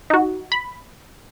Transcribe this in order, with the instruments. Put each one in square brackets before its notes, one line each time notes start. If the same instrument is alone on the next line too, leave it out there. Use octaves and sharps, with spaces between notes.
[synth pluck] D#4 F#4
B5